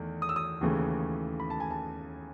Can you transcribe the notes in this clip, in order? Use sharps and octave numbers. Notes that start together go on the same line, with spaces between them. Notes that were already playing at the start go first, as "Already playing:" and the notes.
Already playing: E2 D#3 A3
D#6
E6
D#6
D#2 C#3 E3 A3
B5
A5
G#5
A5